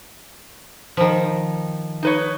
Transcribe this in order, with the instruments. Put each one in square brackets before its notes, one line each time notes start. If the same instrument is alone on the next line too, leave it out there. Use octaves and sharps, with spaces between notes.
[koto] D#3 F3
[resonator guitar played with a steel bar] D#4 B4 C#5